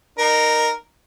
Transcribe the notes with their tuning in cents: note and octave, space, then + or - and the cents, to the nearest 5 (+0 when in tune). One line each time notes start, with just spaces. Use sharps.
D#4 -25 A#4 +0